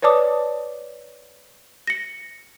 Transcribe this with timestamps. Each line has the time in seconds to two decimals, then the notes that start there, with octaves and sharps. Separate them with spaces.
0.02 B4 C#5 D5 A5 D6 D#6
1.87 A#6 C#7